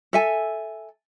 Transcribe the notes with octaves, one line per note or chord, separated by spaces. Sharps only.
A4 E5 G#5